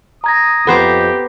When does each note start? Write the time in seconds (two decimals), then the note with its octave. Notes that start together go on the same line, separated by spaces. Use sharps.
0.24 A#5 D#6 G#6 A#6
0.67 F2 B3 G4 A4 C5 A#5